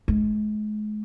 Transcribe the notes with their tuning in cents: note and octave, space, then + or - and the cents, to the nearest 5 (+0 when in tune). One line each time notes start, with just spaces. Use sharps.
G#3 +35